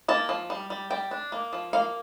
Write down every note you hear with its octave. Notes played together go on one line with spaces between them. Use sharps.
A#3 A5
F3
G3
G3
G3 G5
D4
A#3
F3
A#3 F5